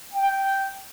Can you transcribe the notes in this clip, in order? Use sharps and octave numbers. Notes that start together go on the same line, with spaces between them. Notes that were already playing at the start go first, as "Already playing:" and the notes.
G5